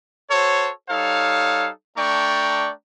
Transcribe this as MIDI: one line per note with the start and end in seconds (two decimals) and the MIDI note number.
0.30 0.70 66
0.30 0.70 69
0.30 0.70 72
0.30 0.70 73
0.89 1.69 55
0.89 1.69 63
0.89 1.69 69
0.89 1.69 73
0.89 1.69 77
1.97 2.71 57
1.97 2.71 62
1.97 2.71 74
1.97 2.71 79
1.97 2.71 82
1.97 2.71 85